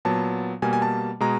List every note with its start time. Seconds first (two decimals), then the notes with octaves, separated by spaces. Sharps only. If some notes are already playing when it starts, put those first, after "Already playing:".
0.05 A#2 F#3 B3 A5
0.62 B2 G3 A#3 G#5
0.73 G#5
0.82 A5
1.20 B2 G#3 A#5